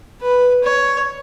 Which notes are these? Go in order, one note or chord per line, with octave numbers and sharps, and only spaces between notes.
B4
C#5